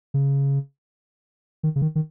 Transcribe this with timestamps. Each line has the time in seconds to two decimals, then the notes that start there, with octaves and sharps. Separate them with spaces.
0.14 C#3
1.63 D#3
1.76 C#3
1.82 D#3
1.95 D#3